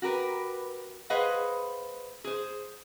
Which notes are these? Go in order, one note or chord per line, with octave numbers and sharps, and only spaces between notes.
F#4 G4 A#4 B4
G#4 B4 C5 D#5 F5 F#5
G#4 C5